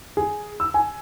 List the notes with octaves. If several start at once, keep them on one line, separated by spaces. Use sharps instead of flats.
G#4
E6
G#5